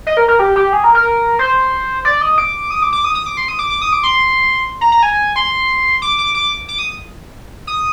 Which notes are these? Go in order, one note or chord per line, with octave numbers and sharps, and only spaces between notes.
D#5
A#4
A#4
G4
G4
G#4
A#4
A#4
C5
D5
D#5
D6
D#6
D6
D6
D#6
D#6
D6
C6
D#6
D6
D6
D#6
D6
C6
A#5
A#5
G#5
C6
D6
D6
D6
D6
D#6
D#6